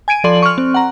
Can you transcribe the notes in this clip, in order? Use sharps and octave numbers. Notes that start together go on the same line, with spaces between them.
G#5 G#6 D7 D#7
F3 A4 D5 C6 F#7
C#6 F6
C4
F#5 A#5